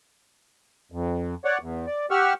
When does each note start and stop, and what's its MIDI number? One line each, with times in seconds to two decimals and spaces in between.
0.92 1.35 41
1.45 1.58 73
1.45 1.58 74
1.45 1.58 78
1.61 1.86 40
1.87 2.06 74
2.11 2.33 67
2.11 2.33 78
2.11 2.33 85
2.11 2.33 88
2.11 2.33 89